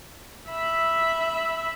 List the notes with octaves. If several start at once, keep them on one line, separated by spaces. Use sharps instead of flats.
E5 B5